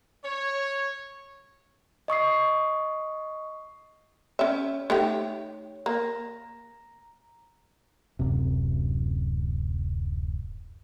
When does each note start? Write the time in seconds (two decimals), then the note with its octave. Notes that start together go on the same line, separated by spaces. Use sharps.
0.24 C#5
2.08 D#5 C#6 D#6 C7
4.39 C#4 C#5 E5
4.90 A3 D#4 G4
5.86 A#3 A#5
8.19 D1 F#2 C3